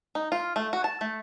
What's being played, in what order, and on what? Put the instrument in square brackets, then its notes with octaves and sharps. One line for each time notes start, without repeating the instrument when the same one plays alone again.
[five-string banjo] D#4
F4
A3
F#4
A5
A3